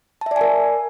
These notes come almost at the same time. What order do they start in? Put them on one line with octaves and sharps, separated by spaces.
A5 E5 D5 G#5 A#4